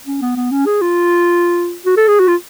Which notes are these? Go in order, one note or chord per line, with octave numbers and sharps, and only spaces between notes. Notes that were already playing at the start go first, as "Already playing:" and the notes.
C#4
B3
B3
C#4
G#4
F4
F#4
A4
G#4
F#4
F4